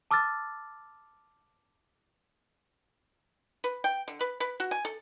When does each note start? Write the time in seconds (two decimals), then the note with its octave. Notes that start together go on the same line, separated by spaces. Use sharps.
0.11 A5 D6 E6 F6 A6
3.64 B4
3.84 G5
4.08 D3
4.21 B4
4.40 B4
4.60 F#4
4.71 G#5
4.85 A4